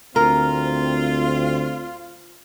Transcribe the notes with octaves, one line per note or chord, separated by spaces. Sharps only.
D2 C4 F4 A#4